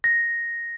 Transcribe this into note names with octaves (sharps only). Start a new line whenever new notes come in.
A#6